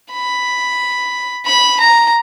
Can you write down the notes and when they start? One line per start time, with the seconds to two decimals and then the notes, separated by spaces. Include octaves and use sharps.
0.12 B5
1.46 B5
1.80 A#5